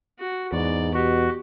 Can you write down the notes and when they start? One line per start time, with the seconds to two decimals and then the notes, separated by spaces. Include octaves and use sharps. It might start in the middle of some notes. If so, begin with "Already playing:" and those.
0.19 F#4
0.52 E2 G#2 D5
0.94 B2 F#4 G4